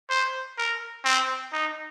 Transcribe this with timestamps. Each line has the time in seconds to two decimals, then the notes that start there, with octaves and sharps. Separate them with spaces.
0.10 C5
0.57 A#4
1.05 C4
1.53 D#4